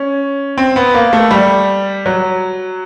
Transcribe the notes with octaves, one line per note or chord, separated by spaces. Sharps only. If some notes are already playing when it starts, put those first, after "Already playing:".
Already playing: C#4
C4
B3
A#3
A3
G3
F#3